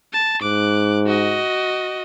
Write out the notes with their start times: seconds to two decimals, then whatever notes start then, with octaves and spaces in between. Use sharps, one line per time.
0.13 A5
0.42 G#2 D6 F#6
1.07 F#4 D#5